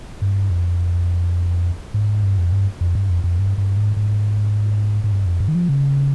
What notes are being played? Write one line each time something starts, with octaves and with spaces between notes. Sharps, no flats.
G2
F2
G#2
G2
F2
G2
F2
G2
F2
F2
G2
G2
G#2
G#2
G#2
G2
F2
G2
D#3
F3
C#3